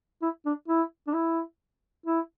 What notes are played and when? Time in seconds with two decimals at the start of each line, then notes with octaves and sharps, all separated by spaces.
0.22 E4
0.46 D4
0.68 E4
1.07 D4
1.13 E4
2.06 E4